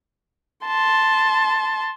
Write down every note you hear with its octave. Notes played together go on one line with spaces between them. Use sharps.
A5 C6